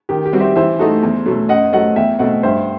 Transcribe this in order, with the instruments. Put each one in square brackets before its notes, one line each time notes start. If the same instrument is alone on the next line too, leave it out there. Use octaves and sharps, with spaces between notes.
[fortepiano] D#3 [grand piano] G4
[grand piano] G4
[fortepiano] G3 C4 F#4
[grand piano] C5 E5
[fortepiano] E3 [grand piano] C5 E5
[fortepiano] A3 D#4 F#4 A4
E2
B2 F#3 A3
[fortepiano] F#2 [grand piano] D#5 F#5
[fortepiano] F#3 A3 [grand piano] D#5 F#5
[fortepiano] E2 [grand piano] E5 G5
[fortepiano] B2 A3 C4 [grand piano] D#5 F#5
[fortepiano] G2 [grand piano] C5 E5